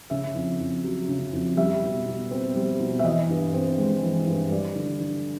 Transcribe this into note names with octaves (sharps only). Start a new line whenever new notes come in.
C#3 E5
F2
F2
F#3
C#3
F2
G3 E5
B2
B2
C4
G3
B2
E5
E3 D#5
G2
C4
G#3
E3
G2
G3 D5
D3
D3